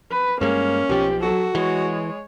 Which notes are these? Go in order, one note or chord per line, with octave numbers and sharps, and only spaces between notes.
B4
G2 G#3 A#3 C#4
B1 B2 F3 G4
F#3 F#4 A4
E3 G#3 C#5